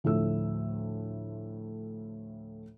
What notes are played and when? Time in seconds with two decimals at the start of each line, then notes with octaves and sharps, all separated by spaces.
0.04 D2 A2 F3 A3 E6